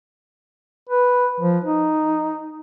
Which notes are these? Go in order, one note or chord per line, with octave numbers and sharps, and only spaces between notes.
B4
F3
D#4